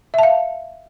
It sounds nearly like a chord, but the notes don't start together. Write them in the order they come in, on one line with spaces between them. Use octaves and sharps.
E5 A5 F5